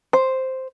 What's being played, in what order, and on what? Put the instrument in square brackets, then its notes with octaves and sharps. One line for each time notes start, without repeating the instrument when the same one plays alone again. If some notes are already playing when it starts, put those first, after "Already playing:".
[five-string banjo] C5